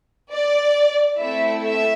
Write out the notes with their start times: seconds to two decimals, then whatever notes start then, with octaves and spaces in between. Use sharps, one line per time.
0.31 D5
1.20 A3 C4 E4 A4 E5
1.64 E5